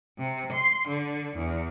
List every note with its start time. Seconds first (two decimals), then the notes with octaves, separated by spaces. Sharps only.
0.19 C3
0.52 C6
0.88 D3
1.35 E2